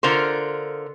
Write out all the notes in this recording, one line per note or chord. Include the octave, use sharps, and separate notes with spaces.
D3 F4 A#4 C5